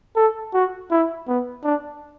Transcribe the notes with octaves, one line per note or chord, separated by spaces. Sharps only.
A4
F#4
E4
B3
D4